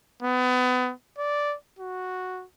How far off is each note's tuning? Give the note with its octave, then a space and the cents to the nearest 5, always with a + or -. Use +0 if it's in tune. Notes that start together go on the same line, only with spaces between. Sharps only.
B3 +30
D5 -5
F#4 -5